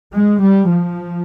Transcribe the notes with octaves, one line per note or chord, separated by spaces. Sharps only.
G#3
G3
F3